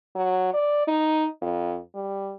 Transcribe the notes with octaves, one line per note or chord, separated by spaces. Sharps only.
F#3
D5
D#4
F2
G3